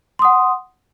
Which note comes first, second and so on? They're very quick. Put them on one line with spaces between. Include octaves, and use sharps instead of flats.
C6 D#6 F#5